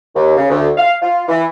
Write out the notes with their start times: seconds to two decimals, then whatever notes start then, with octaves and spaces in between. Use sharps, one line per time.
0.15 D#2
0.37 C#3
0.50 D2
0.77 F5
1.02 F4
1.28 E3